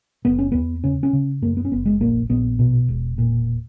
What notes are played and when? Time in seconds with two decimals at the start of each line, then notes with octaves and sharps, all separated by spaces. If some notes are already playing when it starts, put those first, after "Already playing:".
0.25 F#1 B3
0.39 C#4
0.52 E2 B3
0.84 C#3 C#4
1.03 C#4
1.13 C#3
1.42 F#2 A#3
1.57 B3
1.65 C#4
1.72 F#1 B3
1.86 G#3
2.00 A#1 A#3
2.29 A#1 B3
2.59 B2
2.89 E1
3.18 A#2